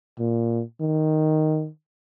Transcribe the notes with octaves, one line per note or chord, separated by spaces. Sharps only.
A#2
D#3